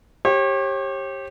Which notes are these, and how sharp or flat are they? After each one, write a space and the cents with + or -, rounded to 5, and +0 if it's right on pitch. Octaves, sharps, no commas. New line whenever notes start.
G4 +0 C#5 -40